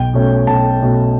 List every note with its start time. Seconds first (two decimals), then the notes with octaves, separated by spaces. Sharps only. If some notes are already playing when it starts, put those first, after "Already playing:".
Already playing: B1 G5
0.14 B2 A3 C#4
0.47 B1 A5
0.80 B2 A3 C#4